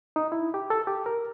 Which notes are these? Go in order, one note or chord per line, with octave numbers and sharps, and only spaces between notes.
D#4
E4
G4
A4
G4
A#4